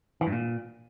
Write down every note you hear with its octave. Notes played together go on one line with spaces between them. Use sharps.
E3
G2
A#2